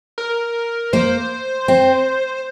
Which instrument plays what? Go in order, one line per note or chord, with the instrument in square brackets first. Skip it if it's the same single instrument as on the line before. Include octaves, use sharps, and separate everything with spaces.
[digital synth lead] A#4
[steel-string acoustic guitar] A#3 [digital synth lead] C5
[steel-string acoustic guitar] C4